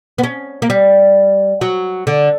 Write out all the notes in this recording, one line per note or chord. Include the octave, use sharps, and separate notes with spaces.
B3
C#4
A#3
G3
F#3
D3